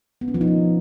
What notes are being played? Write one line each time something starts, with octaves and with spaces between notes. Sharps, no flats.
B3
C#4
F3
D#4
B3